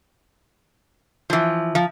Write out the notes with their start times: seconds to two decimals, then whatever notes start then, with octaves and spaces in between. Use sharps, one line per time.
1.30 E3 F3
1.75 F3